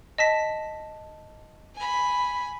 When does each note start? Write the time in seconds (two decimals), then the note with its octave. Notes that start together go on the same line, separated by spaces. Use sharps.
0.18 D#5 A5 B6
1.75 G#5 B5